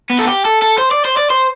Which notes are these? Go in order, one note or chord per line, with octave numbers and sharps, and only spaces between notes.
B3
A4
G4
A4
A4
C5
D5
C5
D5
C5